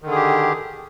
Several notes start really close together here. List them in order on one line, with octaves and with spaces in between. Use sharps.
D#3 D3 G#4 G4